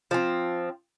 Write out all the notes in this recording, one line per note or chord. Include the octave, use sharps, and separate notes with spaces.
F3 C4